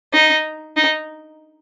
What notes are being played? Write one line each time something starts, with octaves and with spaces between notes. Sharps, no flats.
D#4
D#4